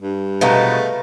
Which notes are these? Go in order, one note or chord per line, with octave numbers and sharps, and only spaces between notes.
G2
B2 F3 G#3 A3 F#4 B4 F5 A#5